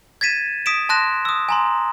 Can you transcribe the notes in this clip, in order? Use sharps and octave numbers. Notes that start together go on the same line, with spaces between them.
G#6 A6 B6 D#7 E7
D#6 B6 D7 E7
A5 C6 F#6 A#6 E7
D#6 E6
G#5 A#5 C6